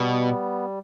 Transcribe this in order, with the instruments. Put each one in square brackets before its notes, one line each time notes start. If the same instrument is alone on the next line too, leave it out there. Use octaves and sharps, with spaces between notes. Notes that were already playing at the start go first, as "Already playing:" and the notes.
Already playing: [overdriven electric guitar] B2 [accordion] G3 B3